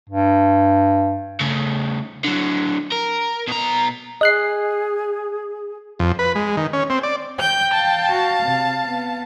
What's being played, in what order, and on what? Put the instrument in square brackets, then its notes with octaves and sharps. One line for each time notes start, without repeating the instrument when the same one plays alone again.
[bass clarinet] G2
[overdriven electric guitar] C#3 A3
D3 F#3
A#4
B2 A#5
[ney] G#4 [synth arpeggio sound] D#5 F#6 C7
[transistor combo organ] F2
B4
G#3
D#3
C#4
C4
D5
[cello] G5 [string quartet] G6
[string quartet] F5 A5
[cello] F#4
C3
B3